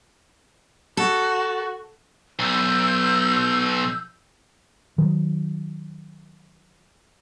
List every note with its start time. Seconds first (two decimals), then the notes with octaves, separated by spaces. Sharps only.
0.97 F#4 A4
2.39 B1 E6 G6
4.98 D#3 F#3